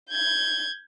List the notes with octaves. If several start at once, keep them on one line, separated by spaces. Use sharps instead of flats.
G6 G#6